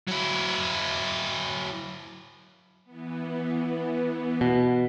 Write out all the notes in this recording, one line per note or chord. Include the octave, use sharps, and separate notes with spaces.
F#3 E4
E3 B3
B2